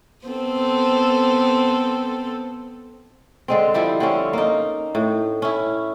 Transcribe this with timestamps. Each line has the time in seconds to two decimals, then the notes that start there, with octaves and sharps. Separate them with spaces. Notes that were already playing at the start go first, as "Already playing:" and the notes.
0.25 B3 C4 A4
3.48 D3 G#3 C4
3.74 F3 G3 E4 G4
4.00 D3 C4 C#4
4.33 A#3 D#4
4.95 A2
5.42 C#4 E4